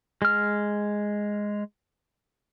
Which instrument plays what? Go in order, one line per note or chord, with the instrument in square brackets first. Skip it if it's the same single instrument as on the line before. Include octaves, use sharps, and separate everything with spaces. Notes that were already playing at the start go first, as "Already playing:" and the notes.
[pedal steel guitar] G#3 F6